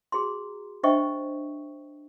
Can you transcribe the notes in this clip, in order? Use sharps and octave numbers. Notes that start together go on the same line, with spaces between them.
F#4 G#4 A#5 C6
D4 C5 D#5 E5 G5 C#6